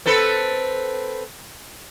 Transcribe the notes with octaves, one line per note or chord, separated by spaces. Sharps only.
C4 A4 B4